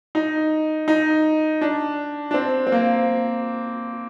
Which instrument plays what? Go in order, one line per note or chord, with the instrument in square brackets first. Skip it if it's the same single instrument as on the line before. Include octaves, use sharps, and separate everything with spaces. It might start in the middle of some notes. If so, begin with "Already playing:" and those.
[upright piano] D#4
D#4
D4
D4
C4
C4
A#3